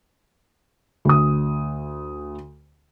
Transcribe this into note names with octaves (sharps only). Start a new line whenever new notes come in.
D2 D#6